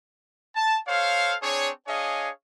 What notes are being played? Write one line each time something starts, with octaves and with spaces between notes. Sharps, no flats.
A5
A4 C5 C#5 F5
C4 D4 G#4 C#5
D4 G#4 C#5 D#5 F5 G#5